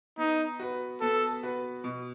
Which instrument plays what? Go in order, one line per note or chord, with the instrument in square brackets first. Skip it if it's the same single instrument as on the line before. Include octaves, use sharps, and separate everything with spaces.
[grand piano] B3 [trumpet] D#4
[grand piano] F#4 B4
[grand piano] B3 [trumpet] A4
[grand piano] F#4 B4
B2